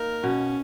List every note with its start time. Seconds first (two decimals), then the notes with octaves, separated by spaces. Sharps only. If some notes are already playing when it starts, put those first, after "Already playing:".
Already playing: A#3 D#4 A#4
0.24 B2 C#4